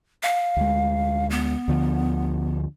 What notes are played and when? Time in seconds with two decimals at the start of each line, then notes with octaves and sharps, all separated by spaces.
0.23 F5
0.57 D2 G#3
1.30 B3
1.68 D2 D3 F3